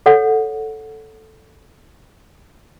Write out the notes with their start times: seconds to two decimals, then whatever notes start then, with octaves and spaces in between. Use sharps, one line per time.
0.06 A4 C#5 F#5